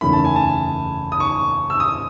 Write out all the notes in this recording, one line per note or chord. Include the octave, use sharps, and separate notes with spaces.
F#1 E2 D#3 A3 C#4 B5
A5
G#5
A5
D#6
C#6
E6
D#6